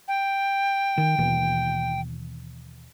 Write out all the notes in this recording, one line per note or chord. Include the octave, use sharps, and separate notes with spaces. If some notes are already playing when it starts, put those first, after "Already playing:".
G5
D#3
D#2 B2 E3